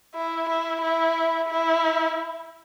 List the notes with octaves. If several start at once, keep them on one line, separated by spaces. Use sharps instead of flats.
E4
E4
E4
E4